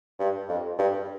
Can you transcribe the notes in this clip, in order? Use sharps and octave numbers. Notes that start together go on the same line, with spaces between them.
G2
F2
G2